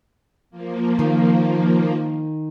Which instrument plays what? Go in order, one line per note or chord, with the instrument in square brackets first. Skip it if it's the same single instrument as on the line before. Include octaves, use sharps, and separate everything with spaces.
[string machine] F3 A#3
[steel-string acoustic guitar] D#3